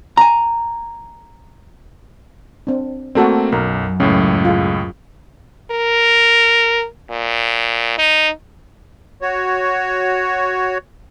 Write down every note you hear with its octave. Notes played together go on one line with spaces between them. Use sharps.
G#5 A#5
C4 D4
A3 A#3 C4 F#4 A4 D5
B1 F#2 A#4
C#2 A2 C#4
F4 G#4
A#4
A#2
D#4
F#4 C#5